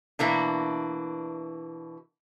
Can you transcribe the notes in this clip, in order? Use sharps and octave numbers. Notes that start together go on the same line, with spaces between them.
B2 E3 A#3 D4